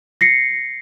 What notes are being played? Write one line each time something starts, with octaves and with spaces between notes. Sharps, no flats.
A#6 C7 C#7